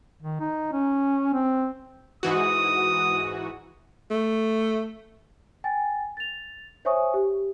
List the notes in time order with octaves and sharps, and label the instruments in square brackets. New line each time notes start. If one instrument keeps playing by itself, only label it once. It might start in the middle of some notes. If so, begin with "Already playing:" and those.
[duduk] D#3
D#4
C#4
C4
[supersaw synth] G#2 E3 F#4 [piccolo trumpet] D#6
[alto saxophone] A3
[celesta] G5 G#5 A6
A6 F7
C5 C#5 E5 G#5 C#6 D#6
G4